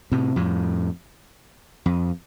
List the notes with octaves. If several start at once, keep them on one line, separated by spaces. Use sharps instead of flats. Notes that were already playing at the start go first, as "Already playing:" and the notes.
A2 C3
F2 A2
F2